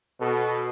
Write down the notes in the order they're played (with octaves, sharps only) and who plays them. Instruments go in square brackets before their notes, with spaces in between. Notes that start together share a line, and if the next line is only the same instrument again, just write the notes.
[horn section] B2 A4